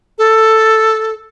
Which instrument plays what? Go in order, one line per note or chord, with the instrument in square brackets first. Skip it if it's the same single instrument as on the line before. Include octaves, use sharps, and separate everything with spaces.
[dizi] A4